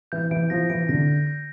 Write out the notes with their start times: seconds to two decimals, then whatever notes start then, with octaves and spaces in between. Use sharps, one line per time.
0.12 E3 G6
0.31 E3 D7
0.50 F3 A#6
0.70 E3 D7
0.89 D3 A#6
1.08 G6
1.27 G6